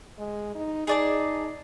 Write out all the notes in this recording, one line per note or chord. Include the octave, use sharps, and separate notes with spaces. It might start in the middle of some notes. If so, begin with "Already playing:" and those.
G#3
D#4
D#4 G#4 D5 A5